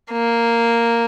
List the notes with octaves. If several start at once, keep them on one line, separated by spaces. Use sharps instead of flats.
A#3